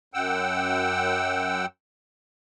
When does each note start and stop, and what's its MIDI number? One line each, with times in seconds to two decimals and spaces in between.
0.14 1.66 42
0.14 1.66 78
0.14 1.66 79
0.14 1.66 88